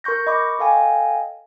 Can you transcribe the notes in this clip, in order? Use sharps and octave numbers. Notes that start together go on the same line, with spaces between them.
A#4 C6 C#6 G6 A#6
D#5 B5 C#6 D6
A4 D#5 F5 G5 G#5